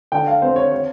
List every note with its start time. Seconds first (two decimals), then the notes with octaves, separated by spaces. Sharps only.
0.12 D3 G5
0.27 F5
0.42 C4 C5
0.56 C#5
0.72 C#5